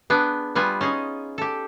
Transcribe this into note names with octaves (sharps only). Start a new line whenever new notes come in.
B3 D4 G#4 G5
G3 B3 F4 G#5
C#4 D#4 G#4
G4 A4